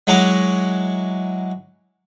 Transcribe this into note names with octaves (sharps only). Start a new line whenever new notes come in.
F#3 G#3 E4 F#4 A#5 D6